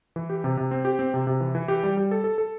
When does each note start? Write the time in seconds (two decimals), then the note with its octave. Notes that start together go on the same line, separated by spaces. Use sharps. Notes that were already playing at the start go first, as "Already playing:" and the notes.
0.16 E3
0.30 G4
0.44 C3
0.57 C3
0.71 C4
0.85 G4
0.99 C4
1.14 C3
1.27 C3
1.40 E3
1.55 E3
1.68 G4
1.83 G3
1.97 G3
2.11 A4
2.24 A4
2.38 A4